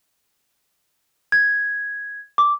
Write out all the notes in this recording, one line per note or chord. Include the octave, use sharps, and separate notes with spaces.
G#6
D6